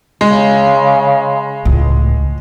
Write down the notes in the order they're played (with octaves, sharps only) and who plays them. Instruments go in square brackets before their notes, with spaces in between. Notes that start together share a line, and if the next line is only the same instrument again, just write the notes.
[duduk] C#3 [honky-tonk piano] G#3
[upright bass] C#2 A2